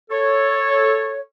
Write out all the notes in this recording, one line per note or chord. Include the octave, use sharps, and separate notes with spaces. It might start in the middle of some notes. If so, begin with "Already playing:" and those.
A4 C#5